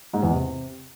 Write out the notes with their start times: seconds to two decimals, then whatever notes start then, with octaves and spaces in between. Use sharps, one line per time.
0.13 G#2
0.23 E2
0.32 C3